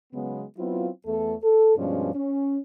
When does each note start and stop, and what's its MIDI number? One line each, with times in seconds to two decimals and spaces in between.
0.13 0.43 49
0.13 0.43 54
0.13 0.43 56
0.13 0.43 59
0.57 0.88 54
0.57 0.88 59
0.57 0.88 60
0.57 0.88 64
0.57 0.88 65
1.05 1.34 40
1.05 1.34 57
1.05 1.34 69
1.42 1.74 69
1.76 2.12 43
1.76 2.12 47
1.76 2.12 53
1.76 2.12 56
1.76 2.12 61
1.76 2.12 62
2.14 2.57 61